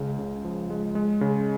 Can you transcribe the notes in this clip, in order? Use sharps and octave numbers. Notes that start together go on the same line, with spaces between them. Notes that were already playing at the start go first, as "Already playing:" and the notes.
Already playing: C#2 C#3
C#3
F3
G#3
G#3
C#3